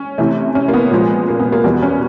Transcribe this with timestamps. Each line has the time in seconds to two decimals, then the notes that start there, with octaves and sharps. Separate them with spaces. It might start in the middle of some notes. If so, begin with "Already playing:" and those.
Already playing: C#4
0.18 C3 E3 A3
0.55 C#4
0.68 A#3
0.73 B3
0.91 A#2 F3 G#3
1.28 A#3
1.39 B3
1.52 A#3
1.64 E2 B2 G3 B3
1.83 C#4